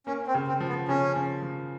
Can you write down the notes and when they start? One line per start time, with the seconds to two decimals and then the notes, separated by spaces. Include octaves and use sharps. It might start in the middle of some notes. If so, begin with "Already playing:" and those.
0.07 A#3 C#4
0.27 C4
0.34 C#3
0.48 C4
0.61 F3
0.68 B3
0.88 C#3 C#4
1.16 F3
1.42 F3